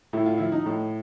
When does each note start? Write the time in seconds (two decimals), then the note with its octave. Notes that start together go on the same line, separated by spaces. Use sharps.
0.13 A2 E4
0.26 F4
0.38 F3 E4
0.52 D#4
0.66 A2